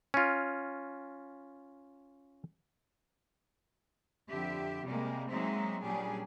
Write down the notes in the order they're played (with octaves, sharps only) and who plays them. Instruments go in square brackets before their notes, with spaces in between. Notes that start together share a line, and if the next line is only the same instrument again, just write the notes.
[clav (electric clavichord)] C#4 F4
[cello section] F2 D3 G4 E5
C3 G3 G#3 A#3
F#3 G#3 A#3 C4 D#4 E5
A#2 F#3 G3 C#4 D4 G#4